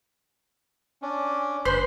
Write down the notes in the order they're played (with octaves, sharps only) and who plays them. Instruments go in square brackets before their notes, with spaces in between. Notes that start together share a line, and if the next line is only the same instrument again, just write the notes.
[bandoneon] C#4 D4
[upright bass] F#1 [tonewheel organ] B4 B5 C6 [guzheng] C5